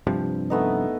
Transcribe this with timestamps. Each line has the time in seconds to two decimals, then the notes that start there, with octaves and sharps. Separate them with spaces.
0.07 G2 C3 F3
0.50 A3 B3 D#4